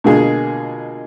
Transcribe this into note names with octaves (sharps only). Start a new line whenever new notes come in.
B2 D3 G#3 A#3 F4 G#4